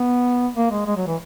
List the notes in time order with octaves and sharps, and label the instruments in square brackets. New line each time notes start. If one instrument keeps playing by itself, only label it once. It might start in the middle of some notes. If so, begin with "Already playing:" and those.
Already playing: [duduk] B3
A#3
G#3
G#3
F#3
E3